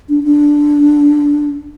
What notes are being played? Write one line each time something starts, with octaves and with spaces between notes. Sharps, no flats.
D4
D4